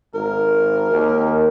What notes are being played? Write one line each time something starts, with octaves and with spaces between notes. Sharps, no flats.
G#1 A#4
D#2